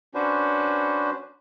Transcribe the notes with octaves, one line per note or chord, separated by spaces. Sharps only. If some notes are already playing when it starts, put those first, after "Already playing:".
C#4 D4 F#4 B4 C5